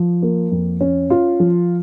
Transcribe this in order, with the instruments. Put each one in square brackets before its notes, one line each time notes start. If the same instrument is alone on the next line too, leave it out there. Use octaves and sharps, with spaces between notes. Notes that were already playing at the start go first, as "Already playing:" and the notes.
Already playing: [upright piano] F3
A#3
F2
C#4
F4
F3